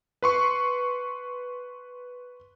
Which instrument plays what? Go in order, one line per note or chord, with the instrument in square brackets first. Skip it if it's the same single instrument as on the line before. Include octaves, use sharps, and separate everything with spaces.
[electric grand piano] B4 C6 C#6